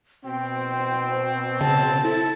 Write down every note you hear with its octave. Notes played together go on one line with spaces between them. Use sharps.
B2 C4 G5
C5
C#3 A5
E4 A4